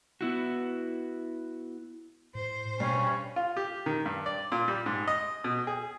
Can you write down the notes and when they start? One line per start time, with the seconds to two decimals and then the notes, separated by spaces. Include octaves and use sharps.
0.21 B3 E4 F#4
2.35 A2 C5
2.80 G2 B2 G3 C#4
3.36 F4
3.57 G4
3.86 D#3
4.06 G2
4.26 D5
4.52 A#2
4.68 G3
4.86 G#2
5.08 D#5
5.44 B2
5.67 G#4